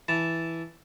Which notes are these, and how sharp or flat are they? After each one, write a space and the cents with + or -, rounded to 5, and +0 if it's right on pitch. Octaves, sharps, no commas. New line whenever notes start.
E3 +0 A5 +0